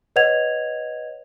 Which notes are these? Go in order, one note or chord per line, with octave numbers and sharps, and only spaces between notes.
B4 C#5 D#5 F#5 G#6 F7